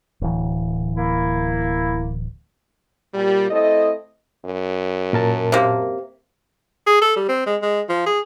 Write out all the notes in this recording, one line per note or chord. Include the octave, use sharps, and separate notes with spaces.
D1 E3
A#3 E4
A#2 G3
A3 C4 E4 A4 D#5
F#2
A#2 A#4 A5
C3 A#3
G#4
A4
G3
C4
G#3
G#3
F3
G#4